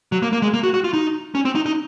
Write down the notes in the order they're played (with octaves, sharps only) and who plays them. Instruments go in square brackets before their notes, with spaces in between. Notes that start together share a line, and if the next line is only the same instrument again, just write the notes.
[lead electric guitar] F#3
A#3
A#3
G#3
A#3
F#4
F#4
F4
D#4
C#4
C4
D#4
D#4